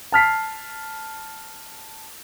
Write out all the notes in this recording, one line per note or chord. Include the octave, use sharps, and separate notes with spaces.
A5 F6 B6 C7